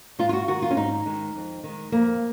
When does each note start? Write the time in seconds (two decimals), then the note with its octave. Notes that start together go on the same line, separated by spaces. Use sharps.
0.19 G#2 F4
0.29 F4
0.33 F#4
0.48 D#3 G#3 F#4
0.62 F4
0.71 C#4
0.77 G#2 D#4
1.06 D#3 G#3
1.35 F2
1.64 D#3
1.69 G#3
1.92 F2 A#3